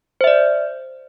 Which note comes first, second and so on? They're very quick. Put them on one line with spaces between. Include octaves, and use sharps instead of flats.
C5 E5 D5